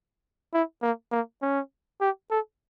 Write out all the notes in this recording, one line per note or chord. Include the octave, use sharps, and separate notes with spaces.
E4
A#3
A#3
C#4
G4
A4